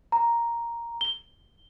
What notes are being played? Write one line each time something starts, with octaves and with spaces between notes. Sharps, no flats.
A#5
G7